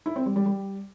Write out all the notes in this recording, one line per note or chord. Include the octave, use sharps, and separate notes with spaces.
E4
C4
G3
G3
G3